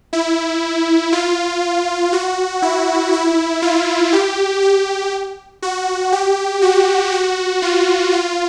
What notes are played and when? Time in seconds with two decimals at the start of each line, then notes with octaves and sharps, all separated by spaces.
0.13 E4
1.12 F4
2.13 F#4
2.62 E4
3.12 E4
3.62 F4
4.13 G4
4.62 G4
5.62 F#4
6.12 G4
6.62 F#4
7.12 F#4
7.62 F4
8.12 F4